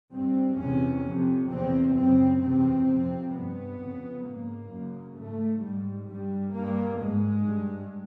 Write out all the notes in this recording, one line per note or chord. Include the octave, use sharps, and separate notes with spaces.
G2 C4
E2 C3 C#4
F2 C3
E2 C3 C4
F#2 C#3 C4
E2 C3 C4
F2 C3
G2 B3
F2 C#3
G#2 A#3
F#2 C#3
G#2 A3
G#2 G3
G2 G3
G2 A#3
G#2 G#3
G2